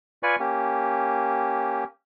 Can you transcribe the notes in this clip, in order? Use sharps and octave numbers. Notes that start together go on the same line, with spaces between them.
F4 B4 D5 G#5 C#6
A#3 C#4 G4